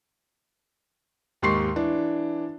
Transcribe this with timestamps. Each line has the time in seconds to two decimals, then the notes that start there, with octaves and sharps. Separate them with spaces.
1.42 D#2 G#2 G4 C6 C#6 C7
1.76 E3 D4